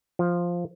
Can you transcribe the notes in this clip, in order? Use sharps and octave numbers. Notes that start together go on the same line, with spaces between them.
F3